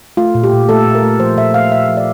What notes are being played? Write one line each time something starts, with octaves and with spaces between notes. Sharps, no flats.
A3 F4
A#2
G4
A#2
A3 A4
A#2
A#4
A3
F3 C5
A#2 E5
A3 F5
A#2 E5
F3
D5